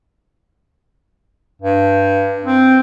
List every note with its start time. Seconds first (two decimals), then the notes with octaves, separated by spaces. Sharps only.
1.62 G2
2.45 C4